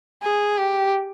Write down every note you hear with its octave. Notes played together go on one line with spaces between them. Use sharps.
G#4
G4